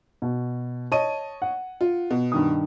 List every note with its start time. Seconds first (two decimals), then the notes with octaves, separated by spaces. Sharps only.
0.22 B2
0.92 C#5 D#5 A5 D#7
1.42 F#5
1.81 F4
2.10 B2
2.32 G2 D#3 D#6